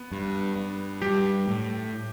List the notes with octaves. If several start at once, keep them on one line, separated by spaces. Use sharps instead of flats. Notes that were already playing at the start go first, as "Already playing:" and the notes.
Already playing: B3
G2
G2
G3 G4
A2